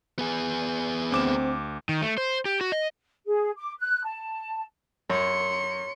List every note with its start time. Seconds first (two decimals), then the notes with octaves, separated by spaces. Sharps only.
0.19 B3 G#4
1.12 D2 C4 D6 E7
1.89 D#3
2.02 A3
2.18 C5
2.45 G4
2.61 F#4
2.72 D#5
3.26 G#4
3.57 D6
3.79 F#6
4.04 A5
5.10 F#2 C#5 C6 C#7